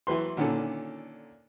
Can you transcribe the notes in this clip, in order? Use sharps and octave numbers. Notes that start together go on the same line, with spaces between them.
E3 F#3 B4 C6
A#2 D3 D#3 C#4 F4 A4